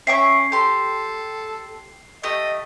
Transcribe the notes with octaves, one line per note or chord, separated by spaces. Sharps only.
C#4 E5 G5 C#6 C7
G4 A4 C6
A3 G4 D#5